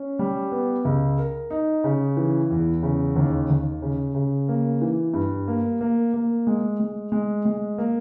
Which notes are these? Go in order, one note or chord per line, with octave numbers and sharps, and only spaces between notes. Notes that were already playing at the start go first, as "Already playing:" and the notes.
Already playing: C#4
G3
B3
C#2
A#4
D#4
C#3
E3
E2
C#3
D#2
D#2
C#3
C#3
A#3
E3
G2
A#3
A#3
A#3
G#3
G#3
G#3
G#3
A#3